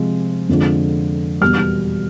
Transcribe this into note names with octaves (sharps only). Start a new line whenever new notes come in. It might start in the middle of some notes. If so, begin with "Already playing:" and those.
Already playing: C3 F3 G#3
F2 D3 F3 G#3
E2 B2 G3 F6